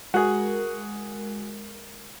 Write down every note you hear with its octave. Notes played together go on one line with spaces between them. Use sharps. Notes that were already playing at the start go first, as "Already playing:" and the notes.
G#3 F#4 G#4 A#4